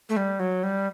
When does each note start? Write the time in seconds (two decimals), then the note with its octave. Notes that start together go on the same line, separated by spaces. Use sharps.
0.09 A3
0.17 G3
0.40 F#3
0.63 G3